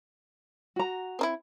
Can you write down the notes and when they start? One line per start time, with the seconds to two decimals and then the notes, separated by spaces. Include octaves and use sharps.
0.76 F#4 A#5
1.19 C4 D#4 E4